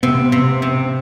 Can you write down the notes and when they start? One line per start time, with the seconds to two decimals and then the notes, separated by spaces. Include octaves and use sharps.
0.03 C3 B3
0.32 C3
0.62 C3